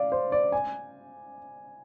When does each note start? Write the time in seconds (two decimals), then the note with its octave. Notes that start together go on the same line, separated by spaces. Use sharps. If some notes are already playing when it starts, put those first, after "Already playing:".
Already playing: D5 F5
0.12 C5
0.32 D5
0.52 G#5